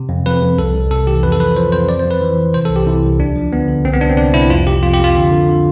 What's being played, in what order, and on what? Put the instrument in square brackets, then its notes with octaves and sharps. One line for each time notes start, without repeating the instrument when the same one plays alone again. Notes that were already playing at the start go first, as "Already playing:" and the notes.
Already playing: [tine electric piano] C3
F2
F2 B4
F2
C2 A4
C2
C3 A4
E3 G4
F2 B4
A4
F3 B4
F3 C5
F2 C5
F2 D5
C5
F2
B4
E3
E3
C3 C5
A4
C2
G4
C3 E4
C2
D2 D4
F3
D3 B3
D3
C2 C4
B3
C3 D4
C4
C2 D4
C2 E4
F2 F4
C3 G4
F2 F4
G4
F2 F4
D3
D3
D3